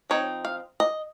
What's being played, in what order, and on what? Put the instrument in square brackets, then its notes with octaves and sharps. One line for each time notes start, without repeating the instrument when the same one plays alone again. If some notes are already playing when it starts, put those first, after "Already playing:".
[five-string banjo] F3 C4 D#4 C#5
F5
D#5